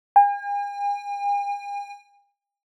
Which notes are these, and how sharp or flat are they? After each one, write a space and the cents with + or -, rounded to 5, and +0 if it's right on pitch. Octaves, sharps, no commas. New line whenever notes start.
G#5 -45